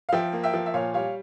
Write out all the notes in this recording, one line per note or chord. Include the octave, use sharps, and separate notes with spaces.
F5
F3 E5 G5
A#3
E5 G5
F3
E5
A#2 C#5 F5
G3 C#5 F5